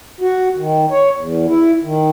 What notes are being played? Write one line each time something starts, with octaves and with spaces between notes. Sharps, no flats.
F#4
D#3
C#5
E2
E4
D#3